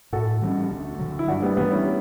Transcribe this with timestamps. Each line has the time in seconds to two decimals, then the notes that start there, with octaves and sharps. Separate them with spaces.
0.13 A2 F#4 A4
0.42 E3 G3 C#4
0.70 D2
0.99 D3 F#3
1.19 E4
1.28 G2 D4 F#4
1.42 G3 B3
1.57 E3 G3 A3 B3
1.71 C#4 E4